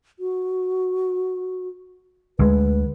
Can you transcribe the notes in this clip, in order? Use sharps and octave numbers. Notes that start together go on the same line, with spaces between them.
F#4
D2 G#3 B4